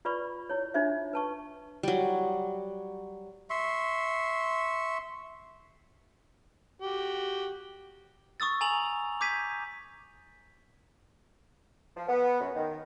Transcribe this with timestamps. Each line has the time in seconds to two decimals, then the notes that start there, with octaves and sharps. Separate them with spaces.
0.05 F4 B4 D5 B5 C#6
0.50 E4 C#5
0.74 D4 D#4 F4 C5 E5
1.13 B4 A5 C#6
1.83 F#3 G3
3.50 E5 C6 C#6
6.81 F#4 G4
8.40 C#6 D#6 E6 A6
8.61 G#5 A#5 A6 F7 F#7
9.21 D6 G6 G#6 B6 D#7
11.96 F3
12.09 B3
12.40 F#2
12.55 D#3